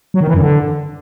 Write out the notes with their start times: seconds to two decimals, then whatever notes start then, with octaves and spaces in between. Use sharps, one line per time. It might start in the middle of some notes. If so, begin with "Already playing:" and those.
0.14 F#3
0.21 D#3
0.27 E3
0.34 F#2
0.41 D3